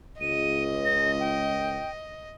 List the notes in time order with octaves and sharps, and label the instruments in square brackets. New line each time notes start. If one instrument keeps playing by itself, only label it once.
[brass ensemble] C#2 [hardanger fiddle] D#5 [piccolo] D#7
[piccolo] A#6
G5